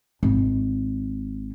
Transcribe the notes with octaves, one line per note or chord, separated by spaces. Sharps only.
G#1